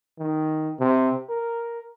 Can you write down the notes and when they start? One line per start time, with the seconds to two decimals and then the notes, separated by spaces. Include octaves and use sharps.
0.19 D#3
0.80 C3
1.30 A#4